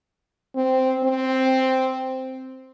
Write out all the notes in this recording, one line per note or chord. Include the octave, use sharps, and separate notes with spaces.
C4
C4